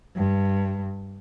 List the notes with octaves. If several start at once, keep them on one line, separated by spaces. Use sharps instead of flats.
G2